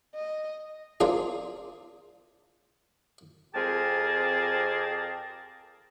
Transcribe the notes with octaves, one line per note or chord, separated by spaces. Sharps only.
D#5
A#3 C4 D4 F4 G#4
F2 C4 G4 G#4 A#4 A5